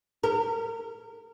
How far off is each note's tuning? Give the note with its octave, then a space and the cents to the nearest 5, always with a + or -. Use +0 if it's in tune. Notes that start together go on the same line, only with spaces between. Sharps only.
A#4 -30